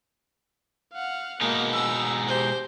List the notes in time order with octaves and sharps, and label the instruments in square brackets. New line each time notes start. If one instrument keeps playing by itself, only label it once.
[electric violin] F5 F#5
[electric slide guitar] B2 G#3 D#4 [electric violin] A#3
[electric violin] E6
G4 C5